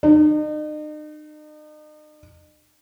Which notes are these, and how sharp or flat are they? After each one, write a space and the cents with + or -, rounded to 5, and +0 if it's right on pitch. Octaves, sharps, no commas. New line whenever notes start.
D#4 -40